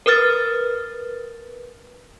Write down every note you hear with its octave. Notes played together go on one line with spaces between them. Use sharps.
A#4 B4 D#6 F6 A6